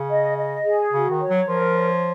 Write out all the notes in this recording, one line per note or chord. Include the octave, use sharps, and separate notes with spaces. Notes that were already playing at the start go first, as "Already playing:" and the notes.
Already playing: C#3
D#5
D#5
G#4
C#3 F#4
D#3
C#5
F#3
F3 A#4
C#5